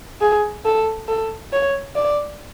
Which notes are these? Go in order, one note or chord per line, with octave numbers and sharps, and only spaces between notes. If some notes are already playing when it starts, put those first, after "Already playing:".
G#4
A4
A4
C#5
D5